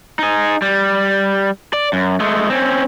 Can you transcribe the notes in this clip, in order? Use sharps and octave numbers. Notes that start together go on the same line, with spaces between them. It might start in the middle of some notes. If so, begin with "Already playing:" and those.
D#4 G#4
G3
D5
F#2
G#3 A3
C4 C#4